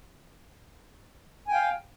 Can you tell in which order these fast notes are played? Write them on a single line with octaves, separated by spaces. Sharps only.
G#5 G5 F5